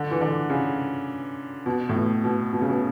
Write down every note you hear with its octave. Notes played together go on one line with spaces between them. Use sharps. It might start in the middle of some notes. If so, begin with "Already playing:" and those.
Already playing: D3
E3
D3
C#3
B2
A2
B2
B2
B2
C#3
B2